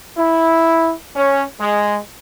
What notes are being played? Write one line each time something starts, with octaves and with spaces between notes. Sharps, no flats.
E4
C#4
G#3